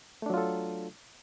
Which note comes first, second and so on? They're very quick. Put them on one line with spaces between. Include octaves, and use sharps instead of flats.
A3 D4 F#3 F4 A4